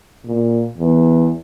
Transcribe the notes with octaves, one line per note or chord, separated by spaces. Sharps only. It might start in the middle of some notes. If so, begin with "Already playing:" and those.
A#2
E2